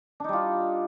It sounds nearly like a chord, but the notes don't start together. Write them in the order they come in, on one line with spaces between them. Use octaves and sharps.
D4 D#4 G3 F4